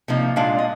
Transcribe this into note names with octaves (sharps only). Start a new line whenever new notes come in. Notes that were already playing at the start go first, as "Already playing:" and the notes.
C3 F3 A#3 D#4
A#2 G#3 D4 F4 F5
D#5